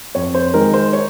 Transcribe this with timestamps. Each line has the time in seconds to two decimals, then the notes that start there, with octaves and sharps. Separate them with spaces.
0.15 F2 C#5
0.35 C5
0.54 D#3 G#3 A#4
0.74 C5
0.93 C#5